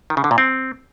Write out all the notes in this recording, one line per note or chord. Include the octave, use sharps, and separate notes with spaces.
D#3
C#3
D3
A#2
C4